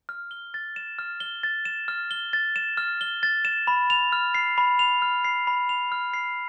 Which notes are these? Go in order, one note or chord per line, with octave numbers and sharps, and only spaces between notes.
F6
G7
A6
E7
F6
G7
A6
E7
F6
G7
A6
E7
F6
G7
A6
E7
B5
F7
F6
C7
B5
F7
F6
C7
B5
F7
F6
C7